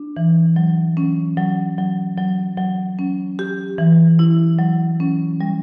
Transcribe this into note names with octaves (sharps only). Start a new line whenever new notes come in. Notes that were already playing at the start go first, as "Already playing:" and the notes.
Already playing: D4
E3
F#3
C#4
F#3
F#3
F#3
F#3
C#4
G4
E3
E4
F#3
C#4
G3